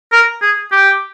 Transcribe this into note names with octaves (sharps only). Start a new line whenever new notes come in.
A#4
G#4
G4